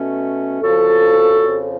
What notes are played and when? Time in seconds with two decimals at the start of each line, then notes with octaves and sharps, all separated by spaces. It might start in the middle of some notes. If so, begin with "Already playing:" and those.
Already playing: B2 A3 C#4
0.61 F2 C#3 F3 F#4 A4
1.41 F2 C#3 F3